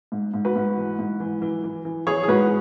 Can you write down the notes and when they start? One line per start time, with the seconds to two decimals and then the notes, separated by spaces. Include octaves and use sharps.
0.12 G#2
0.34 G#2
0.45 F#4 B4
0.56 G#2
0.77 E3
0.99 G#2
1.20 E3
1.42 E3
1.64 E3
1.85 E3
2.07 E3 G#4 C#5
2.23 G#4
2.28 G#2 F#4 B4